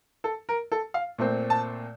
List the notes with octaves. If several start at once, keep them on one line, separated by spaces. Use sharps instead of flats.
A4
A#4
A4
F5
A#2 A3 C4
A5